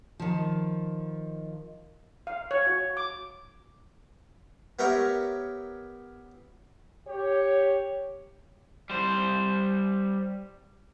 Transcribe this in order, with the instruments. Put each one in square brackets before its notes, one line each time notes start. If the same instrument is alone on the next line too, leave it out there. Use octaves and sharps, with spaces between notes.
[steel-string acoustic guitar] D#3 F3
[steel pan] F5
C#5
F#4
D6
[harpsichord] B3 G4 A#4 C#5 E5
[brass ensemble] G4 C#5
[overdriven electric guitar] G3 C5